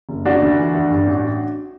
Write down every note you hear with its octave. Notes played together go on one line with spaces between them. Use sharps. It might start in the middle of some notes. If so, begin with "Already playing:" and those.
F#1
C#3 D4 F#4
D2
E3
D2
G2
A1